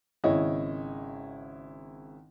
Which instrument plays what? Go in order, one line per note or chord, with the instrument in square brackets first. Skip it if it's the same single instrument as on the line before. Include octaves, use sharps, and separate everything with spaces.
[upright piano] G#1 C#3 E4 C#5 D#5